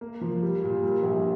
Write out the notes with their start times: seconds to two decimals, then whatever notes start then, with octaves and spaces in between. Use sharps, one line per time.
0.01 A#3
0.21 F3
0.43 G3
0.63 A#2
0.83 G3
1.03 A#1